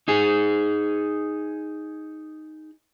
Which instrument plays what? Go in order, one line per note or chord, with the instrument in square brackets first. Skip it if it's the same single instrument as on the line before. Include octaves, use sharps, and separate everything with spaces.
[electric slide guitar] D#4 G#4